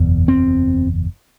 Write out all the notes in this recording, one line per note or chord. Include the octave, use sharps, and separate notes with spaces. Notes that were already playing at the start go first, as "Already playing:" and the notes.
Already playing: F#1 E2 B2
C4